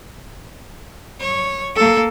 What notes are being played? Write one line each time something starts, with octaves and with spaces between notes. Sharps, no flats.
C#5
A#3 A4